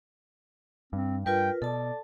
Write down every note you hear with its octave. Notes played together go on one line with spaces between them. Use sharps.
G2 C4
G2 F4 A#4 B4 G5
B2 A4 D5 A5